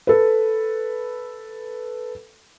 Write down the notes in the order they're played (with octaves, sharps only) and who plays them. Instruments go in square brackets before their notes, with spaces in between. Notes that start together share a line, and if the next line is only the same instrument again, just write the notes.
[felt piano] A4 B4